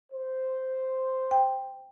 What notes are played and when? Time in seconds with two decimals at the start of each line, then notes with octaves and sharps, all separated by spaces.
0.12 C5
1.31 G5